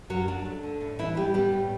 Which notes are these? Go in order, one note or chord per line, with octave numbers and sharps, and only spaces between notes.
F#2 F#3 F#4
F#3 D4
A3
D3
A2
E3 G3 E4
A2 G3 G4
G3 B3 G4
A2